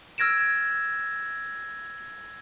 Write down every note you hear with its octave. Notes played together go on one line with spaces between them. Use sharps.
E6 F6 G#6 A#6 D7 E7